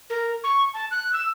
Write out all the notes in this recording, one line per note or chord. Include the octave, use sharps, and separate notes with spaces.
A#4
C#6
A5
F#6
E6